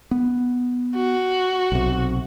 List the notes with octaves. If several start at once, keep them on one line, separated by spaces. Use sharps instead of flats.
B3
F#4
B1 C3